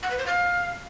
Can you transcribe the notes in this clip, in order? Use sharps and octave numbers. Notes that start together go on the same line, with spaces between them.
F#5
B4
C5
F5